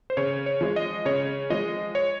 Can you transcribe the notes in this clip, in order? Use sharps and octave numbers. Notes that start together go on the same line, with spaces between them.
C5
C#3 C#5
C#5
F3 G#3
D#5
C#3 C#5
F3 G#3 D#5
C#5